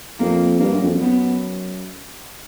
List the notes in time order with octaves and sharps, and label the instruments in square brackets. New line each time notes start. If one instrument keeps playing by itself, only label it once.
[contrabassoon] F2 [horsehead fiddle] A#3
[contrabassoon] G2 [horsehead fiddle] A#3
[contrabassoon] F#2
F2
F#2
[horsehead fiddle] B3